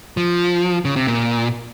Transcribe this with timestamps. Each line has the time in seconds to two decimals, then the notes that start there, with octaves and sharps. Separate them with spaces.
0.17 F3
0.85 C#3
0.96 C3
1.07 A#2